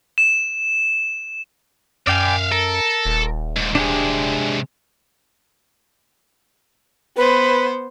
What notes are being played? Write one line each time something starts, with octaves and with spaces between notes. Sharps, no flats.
E7
F#2 D5 E5 F5 G5 G#5
A4 A#4
D#1
D#2 G#2
C3 G#3 D4 G4 G#4
B3 B4 C5